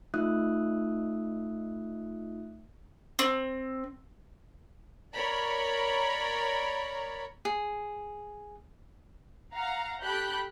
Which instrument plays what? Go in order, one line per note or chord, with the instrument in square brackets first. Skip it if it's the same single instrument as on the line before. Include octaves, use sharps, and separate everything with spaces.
[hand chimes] A3 D#4 F4 E5 D#6 F#6
[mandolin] C4
[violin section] A#4 C#5 D5 A#5 B5
[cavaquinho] G#4
[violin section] F5 F#5 A#5
G4 A4 B5 F#6 G6